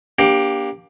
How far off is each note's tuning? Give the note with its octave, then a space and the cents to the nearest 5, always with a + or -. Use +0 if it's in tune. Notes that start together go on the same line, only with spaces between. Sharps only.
A#3 +25 D4 -15 G4 +10